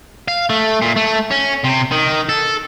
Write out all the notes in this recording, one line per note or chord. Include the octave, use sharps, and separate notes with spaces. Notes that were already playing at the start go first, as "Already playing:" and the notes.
F5
A3
A#2
A3
C#4
C3
D#3
A4